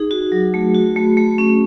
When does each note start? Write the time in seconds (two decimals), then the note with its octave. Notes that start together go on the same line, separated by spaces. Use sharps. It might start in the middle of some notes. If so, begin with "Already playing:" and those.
Already playing: D#4 G#4
0.11 F#4
0.32 F#3
0.54 A3
0.75 F#4
0.96 A3
1.17 A3
1.38 C#4